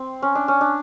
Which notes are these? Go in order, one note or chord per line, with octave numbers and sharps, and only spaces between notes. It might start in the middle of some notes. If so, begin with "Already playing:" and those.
Already playing: C4
C#4
D4
C#4
D4